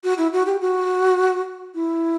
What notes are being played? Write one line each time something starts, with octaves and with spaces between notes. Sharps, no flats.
F#4
E4
F#4
G4
F#4
E4